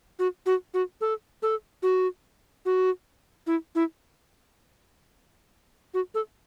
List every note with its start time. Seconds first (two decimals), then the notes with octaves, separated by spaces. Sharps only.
0.19 F#4
0.46 F#4
0.74 F#4
1.01 A4
1.42 A4
1.83 F#4
2.65 F#4
3.47 E4
3.75 E4
5.94 F#4
6.14 A4